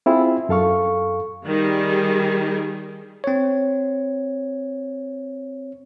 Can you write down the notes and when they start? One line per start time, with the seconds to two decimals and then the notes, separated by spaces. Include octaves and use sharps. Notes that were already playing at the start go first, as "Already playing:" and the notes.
0.06 C4 E4 F4 G#4
0.49 F#2 A4 F5 C#6
1.46 D#3 G3 G#4
3.24 C4 C#5